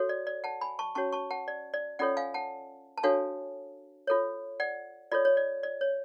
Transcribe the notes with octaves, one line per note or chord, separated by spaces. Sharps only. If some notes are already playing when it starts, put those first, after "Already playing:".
Already playing: F#4 A4 C#5
D5
D5
F#5 A5
G#5 B5
A5 C#6
C#4 F#4 C#5 A5 C#6
A5 C#6
F#5 A5
D5
D5
C#4 F4 A4 C#5 D5 F#5
F5 G#5
F#5 A5
A5
D4 F#4 A4 C#5 F5 G#5
F4 A4 C#5
D5 F#5
F4 A4 C#5 D5
C#5
D5
D5
C#5